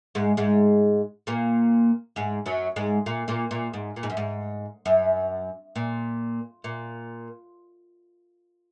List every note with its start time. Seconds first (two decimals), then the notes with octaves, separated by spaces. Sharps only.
0.15 G#2 G#3
0.37 G#2 G#3
1.27 A#2 A#3
2.16 G#2 G#3
2.46 F#2 F#3
2.76 G#2 G#3
3.06 A#2 A#3
3.28 A#2 A#3
3.51 A#2
3.74 G#2
3.96 A#2
4.03 G#2
4.10 F#2
4.17 G#2
4.86 F#2
5.76 A#2
6.64 A#2